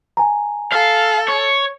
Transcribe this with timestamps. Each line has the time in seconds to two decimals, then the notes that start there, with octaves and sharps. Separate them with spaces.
0.17 G#5 A#5
0.72 A4 F5
1.28 C#5